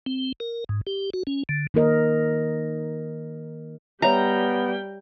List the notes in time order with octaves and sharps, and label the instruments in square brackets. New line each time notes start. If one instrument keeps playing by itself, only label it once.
[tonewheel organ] C4
A#4
G#2
G4
F#4
C#4
D3
[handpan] D#3 A#3 A#4 D#5
[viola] G3 G5 [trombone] B3 [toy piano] C#5 E5 [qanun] A#5